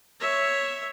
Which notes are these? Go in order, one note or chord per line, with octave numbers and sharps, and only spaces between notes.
C#5 E5